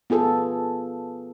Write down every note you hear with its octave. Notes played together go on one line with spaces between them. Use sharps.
B3 F4 G#4 A4